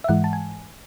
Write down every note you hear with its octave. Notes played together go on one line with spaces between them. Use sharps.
E5
G#2 E3 G#3 F#5
A5
G#5